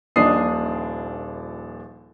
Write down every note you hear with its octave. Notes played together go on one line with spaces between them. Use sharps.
D#1 A#1 D4 D#5 D#6 C7